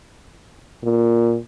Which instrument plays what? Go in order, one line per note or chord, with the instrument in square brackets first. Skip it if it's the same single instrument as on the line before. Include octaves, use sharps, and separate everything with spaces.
[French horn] A#2